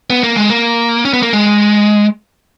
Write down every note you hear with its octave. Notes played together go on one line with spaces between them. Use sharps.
B3
A#3
G#3
A#3
C#4
B3
A#3
G#3